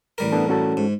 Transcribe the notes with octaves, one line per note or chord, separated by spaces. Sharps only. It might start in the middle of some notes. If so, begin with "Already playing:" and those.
A1 G3 A#4
B3 D4 A4
C#4 F#4 A4
G#2